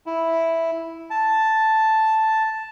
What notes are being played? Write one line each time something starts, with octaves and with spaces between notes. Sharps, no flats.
E4
A5